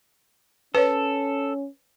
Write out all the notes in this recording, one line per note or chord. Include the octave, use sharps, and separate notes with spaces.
C#4 A4 B4 C#5